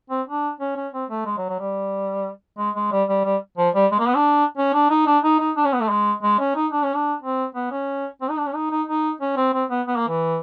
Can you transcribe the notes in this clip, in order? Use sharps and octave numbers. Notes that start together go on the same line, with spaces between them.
C4
D4
C#4
C#4
C4
A3
G#3
F#3
F#3
G3
G#3
G#3
G3
G3
G3
F3
G3
G#3
A#3
B3
D4
C#4
D4
D#4
D4
D#4
D#4
D4
C#4
B3
A3
G#3
G#3
C#4
D#4
D4
C#4
D4
C4
B3
C#4
C4
D#4
D4
C#4
D#4
D#4
D#4
C#4
C4
C4
B3
B3
A#3
E3